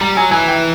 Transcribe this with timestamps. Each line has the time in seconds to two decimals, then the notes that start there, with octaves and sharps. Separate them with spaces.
0.01 G3 A#5
0.16 F#3 G#5
0.31 E3 G#5
0.48 G5